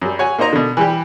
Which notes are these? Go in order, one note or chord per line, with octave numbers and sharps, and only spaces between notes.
F#2 G3
C#5 F#5 G#5
A#3 D#4 C5 D#5 A#5
B2 D3
E3 G3 G4